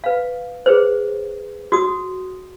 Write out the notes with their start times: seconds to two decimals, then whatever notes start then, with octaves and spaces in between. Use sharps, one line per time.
0.04 B4 F5
0.66 G#4 B4 C5
1.72 F#4 D#6